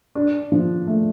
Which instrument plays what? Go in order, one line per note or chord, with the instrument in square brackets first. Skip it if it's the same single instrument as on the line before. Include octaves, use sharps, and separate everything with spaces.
[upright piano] D4
F3
A3